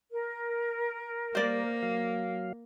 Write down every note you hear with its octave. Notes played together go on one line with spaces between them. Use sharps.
A#4
G3 A#3 C5 D5
F#3 F5